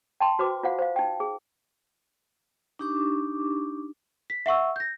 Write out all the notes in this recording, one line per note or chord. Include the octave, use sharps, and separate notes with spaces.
G5 A5 C6
F#4 B4 C5 D6
F4 C5 F5 F#5
C5 F5
D#4 G5
G#4
D4 D#4 G4 C#6 D6
B6
E5 F#5 C#6 E6
G6 A#6